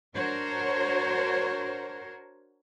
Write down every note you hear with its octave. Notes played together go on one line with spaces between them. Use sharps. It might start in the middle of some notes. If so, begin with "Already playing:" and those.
D4 F#4 A#4 C5 C#5